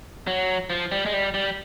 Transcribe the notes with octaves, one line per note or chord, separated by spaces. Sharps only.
F#3
F3
G3
G#3
G3
G3